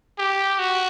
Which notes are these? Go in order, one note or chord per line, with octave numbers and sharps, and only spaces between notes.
G4
F#4